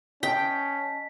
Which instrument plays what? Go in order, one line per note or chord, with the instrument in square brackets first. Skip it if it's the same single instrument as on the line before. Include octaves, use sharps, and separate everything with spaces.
[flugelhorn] C#4 [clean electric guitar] D#5 A5 [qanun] G5 [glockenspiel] B6